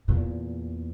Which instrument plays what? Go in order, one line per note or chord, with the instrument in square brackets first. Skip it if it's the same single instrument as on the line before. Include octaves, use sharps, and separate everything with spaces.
[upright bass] E2 A#2